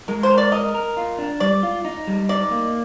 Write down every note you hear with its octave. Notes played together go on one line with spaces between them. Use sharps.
G#3 A#4
C5
A#4
D5
A#4 D#5
A#4
F4
D4
G3 D5
F4
D#4
G3
D#4 D5
A#3